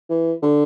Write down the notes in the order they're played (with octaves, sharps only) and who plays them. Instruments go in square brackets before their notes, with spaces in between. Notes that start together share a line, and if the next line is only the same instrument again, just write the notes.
[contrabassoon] E3
D3